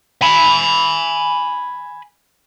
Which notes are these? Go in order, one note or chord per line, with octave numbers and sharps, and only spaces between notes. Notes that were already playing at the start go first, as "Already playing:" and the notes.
G#5 B5